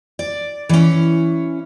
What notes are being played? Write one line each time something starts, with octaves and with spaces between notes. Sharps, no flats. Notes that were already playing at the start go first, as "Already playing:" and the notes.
D5
E3 C#4